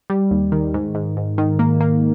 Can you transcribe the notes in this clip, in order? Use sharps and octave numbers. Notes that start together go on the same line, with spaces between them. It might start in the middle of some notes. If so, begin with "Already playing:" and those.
G3
D#2
D#3
G#2
G#2
G#2
D#3
A#3
A#3